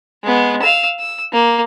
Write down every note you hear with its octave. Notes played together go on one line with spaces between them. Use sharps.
G#3 B3
F5 E6
E6
A#3